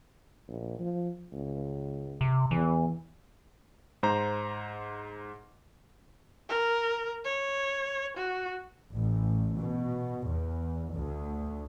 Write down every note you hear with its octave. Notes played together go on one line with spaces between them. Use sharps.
A#1
F3
C#2
C3
E2 E3
G#2 C5 A#5
A#4
C#5
F#4
A1
B2
E2
D2